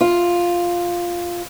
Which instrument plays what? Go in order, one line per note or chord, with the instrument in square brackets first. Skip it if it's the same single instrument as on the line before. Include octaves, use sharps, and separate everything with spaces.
[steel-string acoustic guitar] F4